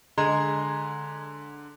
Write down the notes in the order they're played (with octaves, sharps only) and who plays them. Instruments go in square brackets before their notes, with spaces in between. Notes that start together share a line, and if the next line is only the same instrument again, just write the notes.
[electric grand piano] D3 G#6 [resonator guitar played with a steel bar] G#3 [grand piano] A#5 C6